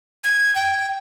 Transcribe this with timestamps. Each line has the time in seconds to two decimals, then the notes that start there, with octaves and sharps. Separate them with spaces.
0.24 G#6
0.55 G5